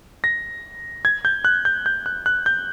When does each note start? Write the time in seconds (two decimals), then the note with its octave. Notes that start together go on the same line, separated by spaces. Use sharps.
0.24 A#6
1.05 G#6
1.25 G6
1.45 F#6
1.65 G6
1.86 G6
2.06 F#6
2.26 F#6
2.46 G6